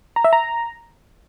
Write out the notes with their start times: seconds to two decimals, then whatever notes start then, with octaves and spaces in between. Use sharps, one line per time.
0.16 A#5
0.24 E5
0.33 A#5